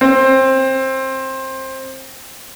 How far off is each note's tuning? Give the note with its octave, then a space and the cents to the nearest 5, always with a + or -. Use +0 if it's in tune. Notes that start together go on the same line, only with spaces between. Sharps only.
C4 +20